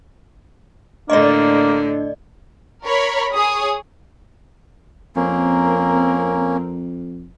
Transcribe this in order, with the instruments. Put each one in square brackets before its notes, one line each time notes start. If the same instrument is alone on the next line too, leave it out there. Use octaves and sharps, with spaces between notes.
[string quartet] A2 D3 [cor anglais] A#3 [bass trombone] D4 [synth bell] D5 D#5
[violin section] A#4 C#5 B5
G#4 C#5 D#6
[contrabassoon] F2 [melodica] A#3 C#4 [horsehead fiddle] C4 A#4